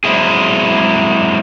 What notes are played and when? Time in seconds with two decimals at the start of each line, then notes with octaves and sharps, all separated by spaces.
0.04 F#3 G#3 C4 E4 G#4